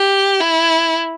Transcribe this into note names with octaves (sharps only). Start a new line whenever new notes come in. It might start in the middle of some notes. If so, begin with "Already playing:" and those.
Already playing: G4
E4